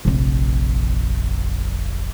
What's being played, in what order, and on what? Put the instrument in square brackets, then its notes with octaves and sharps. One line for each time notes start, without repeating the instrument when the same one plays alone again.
[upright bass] F1 A#1